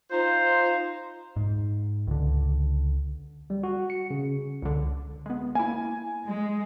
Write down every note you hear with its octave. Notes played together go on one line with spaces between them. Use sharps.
D#4 F4 C5
G#2
C#2 D3
G3
F#4
C#7
C#3
C#2 D3
G#3 B3
A#3 E4 G#5
G#3